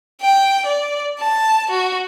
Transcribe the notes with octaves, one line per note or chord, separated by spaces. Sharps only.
G5
D5
A5
F#4